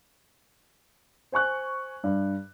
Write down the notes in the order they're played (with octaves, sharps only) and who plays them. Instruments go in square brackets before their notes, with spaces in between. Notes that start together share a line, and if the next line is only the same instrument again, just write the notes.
[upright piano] C5 G#5 C#6 F#6
G2